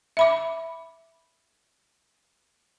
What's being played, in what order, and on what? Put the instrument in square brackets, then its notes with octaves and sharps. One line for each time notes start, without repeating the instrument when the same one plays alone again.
[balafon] E5 B5 D6